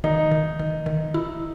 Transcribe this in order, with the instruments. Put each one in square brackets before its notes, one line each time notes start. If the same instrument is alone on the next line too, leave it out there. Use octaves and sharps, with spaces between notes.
[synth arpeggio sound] D#3 [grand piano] D#4
[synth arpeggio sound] D#3
D#3
D#3
E4